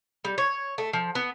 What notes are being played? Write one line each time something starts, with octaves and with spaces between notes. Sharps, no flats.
G3
C#5
A3
F3
B3